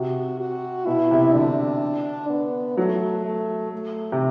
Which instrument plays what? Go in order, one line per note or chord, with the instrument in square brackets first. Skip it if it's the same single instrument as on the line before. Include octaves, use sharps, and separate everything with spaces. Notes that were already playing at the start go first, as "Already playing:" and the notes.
Already playing: [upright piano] C3 [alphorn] F#4
[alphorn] F#4
[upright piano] B2 [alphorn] E4
[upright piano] C3
[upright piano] D3 [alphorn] D4
[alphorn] B3
[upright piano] F#3 [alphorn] A3
[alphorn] A3
A3
[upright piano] C3